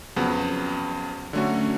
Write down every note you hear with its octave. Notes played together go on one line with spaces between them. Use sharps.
F2 C#3 F#3 B3
D3 F#3 A3 C#4 F#4